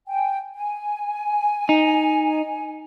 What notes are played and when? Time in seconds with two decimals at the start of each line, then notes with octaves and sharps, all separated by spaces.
0.08 G5 G#5
0.55 G#5
1.69 D#4